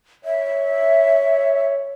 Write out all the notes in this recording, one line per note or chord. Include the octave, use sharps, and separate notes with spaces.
C#5 E5